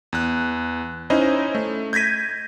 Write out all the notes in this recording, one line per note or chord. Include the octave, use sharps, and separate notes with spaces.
E2 F#6
C#4 D#4 E4 C5 D#5
A3
G6 G#6 A#6 B6 D#7